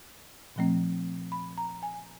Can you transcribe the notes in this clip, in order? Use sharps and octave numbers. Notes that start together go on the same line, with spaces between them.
A#2 F3 A3 C4
B5
A#5
G#5